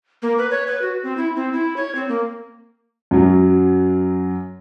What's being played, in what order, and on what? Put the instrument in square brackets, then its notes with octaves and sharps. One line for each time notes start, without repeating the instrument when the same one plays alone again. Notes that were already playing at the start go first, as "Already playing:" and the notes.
[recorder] A#3
B4
C#5
B4
F#4
C4
E4
C4
E4
C#5
C4
A#3
[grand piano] F#2 F#3